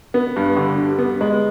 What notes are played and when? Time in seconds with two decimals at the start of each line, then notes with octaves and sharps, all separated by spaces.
0.14 B3
0.36 G2
0.57 D3
0.78 G3
0.98 B3
1.21 G#3